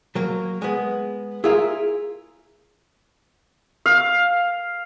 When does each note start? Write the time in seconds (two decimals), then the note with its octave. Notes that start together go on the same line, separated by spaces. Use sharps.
0.15 F#3 A#3
0.62 G#3 B3
1.44 E4 F4 G#4 A#4 E5
3.86 F5